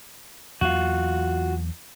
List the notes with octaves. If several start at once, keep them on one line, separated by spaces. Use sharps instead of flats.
E2 F#3 A#3 F4 F#4